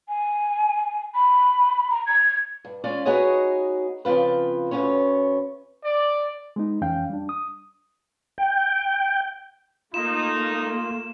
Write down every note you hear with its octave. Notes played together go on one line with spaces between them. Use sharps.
G#5
B5
A#5
G#6
G2
G#3 C#4 F4 D5 F5
B3 D#4 F#4 G#4 C#5 D#5
C#3 F3 C4 F4 B4
D2 A#2 B3 C#4 C#5
D5
G#3 B3 D#4
F2 E3 C#4 F5 G5 G6
G3 D4
D#6
G5
A3 A#3 D#4 F4 E7